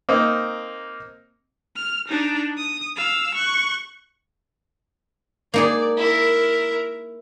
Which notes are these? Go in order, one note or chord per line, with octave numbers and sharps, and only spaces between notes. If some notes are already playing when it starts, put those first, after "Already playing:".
A#3 C4 D#4
F6
D4 D#4
D#6
F5 E6
C#6 F#6
A#3 D#4 G#4 D5
E4 A#4